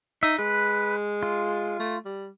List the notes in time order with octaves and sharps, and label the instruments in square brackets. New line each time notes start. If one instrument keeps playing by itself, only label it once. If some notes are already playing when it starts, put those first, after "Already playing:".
[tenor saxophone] D#4 [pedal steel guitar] E5
[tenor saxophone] G#3 [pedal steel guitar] B4
[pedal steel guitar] F4
[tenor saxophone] A3
G3